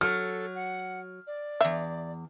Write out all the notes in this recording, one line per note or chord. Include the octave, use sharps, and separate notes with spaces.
F#3 A4 F6
F#5
D5
E2 G#2 E5